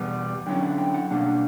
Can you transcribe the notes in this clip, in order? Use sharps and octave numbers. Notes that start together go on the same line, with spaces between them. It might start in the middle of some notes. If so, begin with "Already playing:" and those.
Already playing: E2 B2 G3 B3 F#5
D3 F#3 C#4 E4 G5
F#5
G5
F#5
B2 G3 A#3 D4 F#5